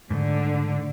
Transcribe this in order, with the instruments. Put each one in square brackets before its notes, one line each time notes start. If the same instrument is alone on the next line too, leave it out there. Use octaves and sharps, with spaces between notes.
[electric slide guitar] G#2 A3 [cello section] D3